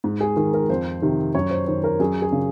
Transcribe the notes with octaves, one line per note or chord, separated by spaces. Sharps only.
G#2
G#4
D#3 A#4
A#4
F2 C5
C3 D#3
F#2 C#5
C5
D#3 C5
A#4
F#2 G#4
G#4
C#3